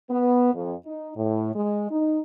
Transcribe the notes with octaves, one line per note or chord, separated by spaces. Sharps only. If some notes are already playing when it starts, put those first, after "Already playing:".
B3
F2
D#4
A2
G#3
D#4